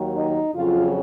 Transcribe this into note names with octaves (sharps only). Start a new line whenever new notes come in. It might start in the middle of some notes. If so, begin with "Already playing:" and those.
Already playing: D#2 D#3 F#3
D#4
F2 C#3 F#3 F4